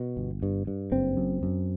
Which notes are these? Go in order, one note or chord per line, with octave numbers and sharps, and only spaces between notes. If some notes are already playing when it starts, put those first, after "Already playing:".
Already playing: B2
G1
G2
G2
F#1 C4
F#2
F#2